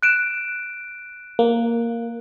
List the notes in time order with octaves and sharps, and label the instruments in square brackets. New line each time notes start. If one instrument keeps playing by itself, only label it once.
[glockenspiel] F#6 D7 E7
[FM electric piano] A#3